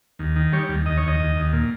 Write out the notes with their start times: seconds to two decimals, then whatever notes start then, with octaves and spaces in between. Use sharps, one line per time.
0.19 D#2
0.36 D#3
0.53 G3 C#5
0.69 D#2
0.86 D#2 D#5
0.97 C#5
1.03 D#2 D#5
1.20 D#2
1.36 D#2
1.53 A#2